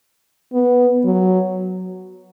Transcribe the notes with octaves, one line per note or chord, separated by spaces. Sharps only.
B3
F#3